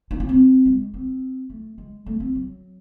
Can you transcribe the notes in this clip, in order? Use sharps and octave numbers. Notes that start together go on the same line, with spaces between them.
D#4
C#4
C4
G#3
C4
A3
G#3
A3
C4
F#3